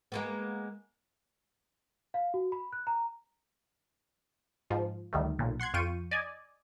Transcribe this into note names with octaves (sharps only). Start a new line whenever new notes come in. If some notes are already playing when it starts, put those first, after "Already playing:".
G#3 A#3 B3
F5
F#4
B5
F#6
A#5
G#2 F3
D2 D#3 G3 A3
B1 A#2
F#5 C6 F#6 G#6
F2 F4 G5 C#6 D#7
D5 D#5 G#5